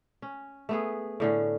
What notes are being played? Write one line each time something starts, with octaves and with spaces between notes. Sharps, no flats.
C#4
A3 B3 G#4
A2 D3 C#4